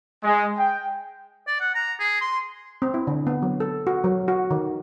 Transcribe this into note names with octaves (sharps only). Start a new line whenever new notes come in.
G#3
G5
D5
F#5
A#5
G#4
C6
C4
E4
D3
B3
F#3
A4
F#4
F#3
F#4
D#3